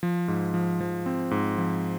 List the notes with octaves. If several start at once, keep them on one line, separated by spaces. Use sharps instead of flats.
F3
G#2
F3
F3
C4
G#2
F3